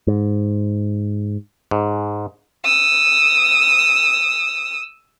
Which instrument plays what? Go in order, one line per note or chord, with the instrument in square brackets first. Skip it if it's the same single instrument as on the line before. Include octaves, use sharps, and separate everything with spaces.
[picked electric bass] G#2
[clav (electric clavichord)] G#2
[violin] D#6 E6